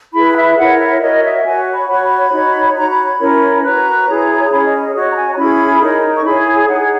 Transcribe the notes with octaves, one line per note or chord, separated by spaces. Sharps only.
E4 G#4 B4 B5
E5
E4 A#4 C#5 F#5
E5
F#4 A#4 C#5 D#5
E5
F#5
F#4 C#5 G#5
B5
F#4 C#5 B5
B5
B5
D#4 F#4 C#5
F#4 C#5 A#5
B5
B5
C#4 E4 A#4 C#5
F#4 B4 A#5
E4 G#4 C#5
A#5
C#4 G#4 C#5 B5
D#5
D#5
F#4 C#5 D#5
A#5
G#5
A#5
C#4 E4 G#4 B5
D#4 A#4 C#5
C#6
E4 G#4 C#5 B5
G#5
D#4 G#4 C#5 F#5